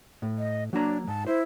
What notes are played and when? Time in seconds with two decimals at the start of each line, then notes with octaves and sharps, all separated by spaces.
0.22 A2
0.38 D#5
0.73 F#3 A#3 D4 A#5
1.07 G#2 A5
1.27 E4 C5